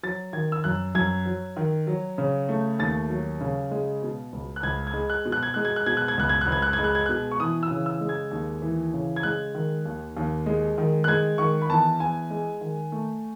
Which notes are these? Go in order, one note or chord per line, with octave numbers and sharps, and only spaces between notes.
F#3 A6
D#3 G#6
E6
F#2 F#6
F#2 G#6
F#3
D#3
F#3
C#3
A3
D#2 A6
F#3
C#3
G#3
B2
C#2
F#6
C#2 G#6
G#6
G#3
F#6
B2
F#6
G#6
G#3 F#6
G#6
F#6
B2 G#6
F#6
G#6
C#2 F#6
G#6
F#6
C#2 G#6
F#6
G#6
G#3
F#6
G#6
B2 F#6
C#6
E3 D#6
E6
C#3
E6
G#3
G#6
D#2
E3
C#3
G#6
G#3 F#6
D#3
D#2
D#2
G#3
D#3
F#6
G#3 G#6
D#3 C#6
B5
E2 A5
E2 G#5
G#3
D#3
A3